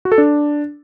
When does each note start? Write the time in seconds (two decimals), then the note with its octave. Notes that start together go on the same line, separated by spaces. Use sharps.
0.05 F#4
0.12 A4
0.18 D4